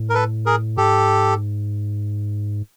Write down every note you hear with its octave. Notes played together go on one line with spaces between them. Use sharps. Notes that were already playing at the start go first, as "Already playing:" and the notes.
Already playing: A2
A#4
A4 B4
G#4 A#4
G#2 G4 A4